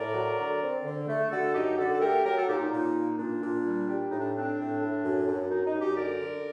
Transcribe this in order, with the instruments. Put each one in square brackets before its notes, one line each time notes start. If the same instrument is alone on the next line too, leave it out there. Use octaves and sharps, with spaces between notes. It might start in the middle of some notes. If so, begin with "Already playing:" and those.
Already playing: [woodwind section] A2 A#4 D5
F#3
D3
C4
D3
A3
D3 F#4 A4
F#2 D#4 G4
D3 F#4 A4
A4
A3 G4 A#4
F#3 G4 A#4
F#4 A4
A#2 D#4 G4
D#4
A#2 D#4
A#3
A#2 D4
A#2
G3
G3
A2 D#4
D4
C4 D4
A2
A2
F#2
F#2
F#2 D#4
D#4
F#2
D#4 G4
D3 A#4 D5
D3